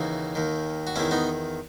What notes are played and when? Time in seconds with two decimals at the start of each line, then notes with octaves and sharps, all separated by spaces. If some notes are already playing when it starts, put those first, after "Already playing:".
Already playing: D#2 C#3 E3 D#4 F#4
0.35 D#2 D#3
0.87 F#4
0.96 E2 D#3 C#4 E4
1.11 B3 D#4